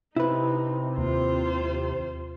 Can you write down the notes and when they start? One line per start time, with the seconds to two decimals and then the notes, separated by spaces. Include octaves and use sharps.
0.16 C3 D#4 E4 B4
0.98 D#2 F4 C5